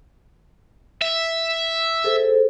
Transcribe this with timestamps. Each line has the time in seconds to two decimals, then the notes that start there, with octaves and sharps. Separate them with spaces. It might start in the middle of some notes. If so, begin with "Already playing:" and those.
1.02 E5
2.04 G#4 A4 C5